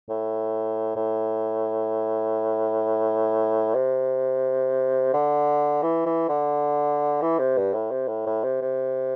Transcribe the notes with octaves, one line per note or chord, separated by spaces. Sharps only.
A2
A2
C3
D3
E3
E3
D3
E3
C3
G2
A2
C3
A2
A2
C3
C3